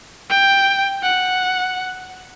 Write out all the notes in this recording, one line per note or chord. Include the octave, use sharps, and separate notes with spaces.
G5
F#5